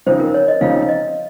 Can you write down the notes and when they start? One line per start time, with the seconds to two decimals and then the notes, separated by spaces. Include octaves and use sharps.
0.06 C#3 F3 C4 D#4 C5
0.20 A#4
0.34 C#5
0.48 D#5
0.61 C#3 F3 C4 D#4 F5
0.89 D#5